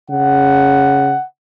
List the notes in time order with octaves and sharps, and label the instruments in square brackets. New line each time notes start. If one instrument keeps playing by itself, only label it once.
[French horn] C#3 [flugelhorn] F#5